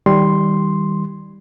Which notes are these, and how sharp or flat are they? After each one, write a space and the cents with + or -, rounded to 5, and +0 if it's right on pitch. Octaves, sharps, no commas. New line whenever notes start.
D#3 +30 G3 +0 C6 +0